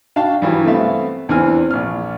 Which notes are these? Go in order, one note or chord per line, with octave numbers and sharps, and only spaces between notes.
D4 F#4 F5 G5 A5
G2 E3 F#3
A3 B3 C4 E5 F5
E2 E3 C4 D4 G#5 F6
A#1 F6